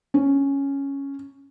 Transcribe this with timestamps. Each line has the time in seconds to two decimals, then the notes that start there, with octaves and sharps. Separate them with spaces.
0.14 C#4